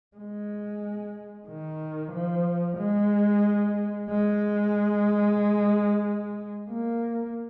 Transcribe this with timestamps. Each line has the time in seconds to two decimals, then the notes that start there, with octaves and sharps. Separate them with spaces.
0.17 G#3
1.48 D#3
2.13 F3
2.78 G#3
4.10 G#3
6.71 A#3